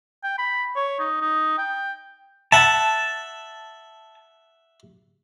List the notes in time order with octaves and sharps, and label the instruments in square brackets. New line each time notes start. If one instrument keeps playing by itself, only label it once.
[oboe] G5
B5
C#5
D#4
D#4
G5
[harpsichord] E5 F#5 [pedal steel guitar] A5